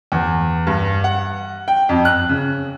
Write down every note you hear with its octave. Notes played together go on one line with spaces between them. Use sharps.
E2
G2
F#5
G5
F2
F#6
C#3